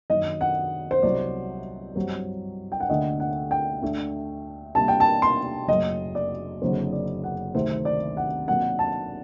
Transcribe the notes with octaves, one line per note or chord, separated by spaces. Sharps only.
F#2 D#3 F#3 D#5
F#5
C5
C2 C3 F#3 D5
G2 F#3 C4 G4
G5
F#5
D2 D3 A3 D#5
F#5
G5
D2 D3 A3 D4
C3 G3 A#3 D4 A5
G5
A5
C6
F#1 F#2 F#3 A3 D#5
D5
F#1 F#2 D3 F#3 C4 C5
D5
F#5
D2 C3 D#3 A3 C4 C5
D5
F#5
C3 F#3 A#3 F#5
A5